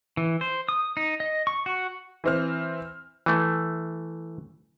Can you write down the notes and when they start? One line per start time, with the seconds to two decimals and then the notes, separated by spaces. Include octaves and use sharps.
0.17 E3
0.41 C5
0.69 D#6
0.97 D#4
1.20 D#5
1.47 C#6
1.66 F#4
2.24 E3 C4 F6
3.26 E3 A3